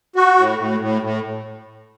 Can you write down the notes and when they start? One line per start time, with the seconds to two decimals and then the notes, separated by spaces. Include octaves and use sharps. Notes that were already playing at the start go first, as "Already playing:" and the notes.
0.16 F#4
0.37 A2
0.59 A2
0.80 A2
1.02 A2